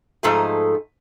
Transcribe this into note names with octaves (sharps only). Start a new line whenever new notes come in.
G#2 F3 A3 D#4 G#4